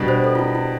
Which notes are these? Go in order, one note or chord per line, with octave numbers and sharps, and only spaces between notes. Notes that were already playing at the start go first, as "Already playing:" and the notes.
Already playing: B2 G3 D4
C5
A4
F4
E4
E4